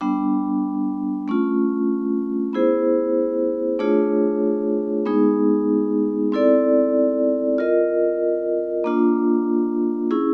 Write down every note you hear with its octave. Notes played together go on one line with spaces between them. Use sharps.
G3 B3 D4
A3 C#4 F4
B3 E4 G#4 C5
A3 D4 F4 G#4 C#5
G#3 B3 D#4 G#4
C4 E4 A4 D5
F4 A#4 D#5
A#3 D4 F4
C#4 E4 G#4